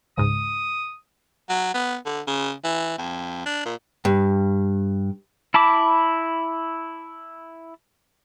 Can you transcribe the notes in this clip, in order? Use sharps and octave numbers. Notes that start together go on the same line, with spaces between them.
C#2 G#2 D#6
F#3
B3
D3
C#3
E3
F2
D4
A#2
G2
E4 A5 B5 D6